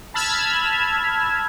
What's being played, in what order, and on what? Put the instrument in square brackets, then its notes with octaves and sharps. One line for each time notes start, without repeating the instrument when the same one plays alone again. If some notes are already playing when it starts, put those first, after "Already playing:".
[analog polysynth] A5 B5 E6 F6 G#6